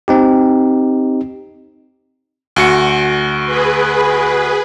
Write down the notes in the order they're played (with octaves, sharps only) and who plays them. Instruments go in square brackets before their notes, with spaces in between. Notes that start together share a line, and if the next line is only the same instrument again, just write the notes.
[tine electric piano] C4 D#4 G4
[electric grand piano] D2 F#4 C#7
[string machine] G#4 B4